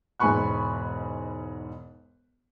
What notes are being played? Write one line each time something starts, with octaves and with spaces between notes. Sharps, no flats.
E1 G#2 G#5 B5 C#6 F#6